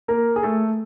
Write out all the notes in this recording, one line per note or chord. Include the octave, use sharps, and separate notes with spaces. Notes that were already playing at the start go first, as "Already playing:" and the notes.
A#3 A#4
G#4
A3 A4